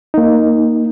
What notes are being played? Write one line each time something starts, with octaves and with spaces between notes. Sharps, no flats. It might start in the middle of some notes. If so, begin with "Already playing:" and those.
A#3 D#4